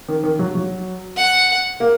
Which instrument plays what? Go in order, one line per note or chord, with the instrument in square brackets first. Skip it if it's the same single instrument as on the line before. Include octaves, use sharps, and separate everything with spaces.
[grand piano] D#3
D#3
F#3
F#3
[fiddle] F#5
[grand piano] A#3